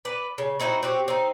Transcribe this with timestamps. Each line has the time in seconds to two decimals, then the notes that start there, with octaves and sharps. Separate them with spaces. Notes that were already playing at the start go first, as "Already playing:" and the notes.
0.05 B4 D5
0.38 C#3
0.60 C4 D#4 E4 F#4
0.83 C4 F#4 G4
1.08 C4 D#4